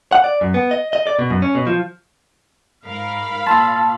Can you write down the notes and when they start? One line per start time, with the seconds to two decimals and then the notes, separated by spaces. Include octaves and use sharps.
0.12 F#5
0.24 D5
0.41 F#2
0.54 B3
0.71 D#5
0.93 D#5
1.07 D5
1.19 B2
1.30 F#2
1.42 C#4
1.55 B2
1.67 F3
2.85 G#2 A#4 F5 B5
3.47 A#2 A5 C6 E6